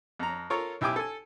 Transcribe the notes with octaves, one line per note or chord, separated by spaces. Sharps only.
F2 A#5
F4 A4 A#4 C#5
B1 E4 G4 G5 G#5 D6
A4 G#5